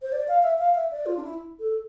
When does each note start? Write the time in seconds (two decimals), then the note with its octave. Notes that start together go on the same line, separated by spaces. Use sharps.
0.02 C5
0.12 D5
0.28 F5
0.43 E5
0.59 F5
0.75 E5
0.91 D5
1.06 F4
1.17 D4
1.23 E4
1.59 A4